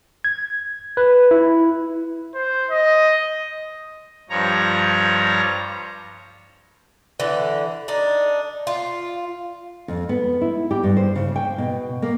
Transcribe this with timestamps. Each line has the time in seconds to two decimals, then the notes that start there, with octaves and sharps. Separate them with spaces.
0.24 G#6
0.97 B4
1.31 E4
2.35 C5
2.71 D#5
4.30 G2 F3 C#5 A#5
7.20 D3 E3
7.88 D4 D#4
8.67 F4
9.88 F2
10.09 B3
10.41 E4
10.71 G4
10.83 G2
10.97 C5
11.15 C#3
11.36 G5
11.58 B2
12.02 A#3